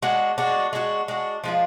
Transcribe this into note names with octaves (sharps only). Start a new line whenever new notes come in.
G#3 D4 F#4
G#3 D4 F#4
G#3 D4 F#4
G#3 D4 F#4
F3 G#3 D4 F4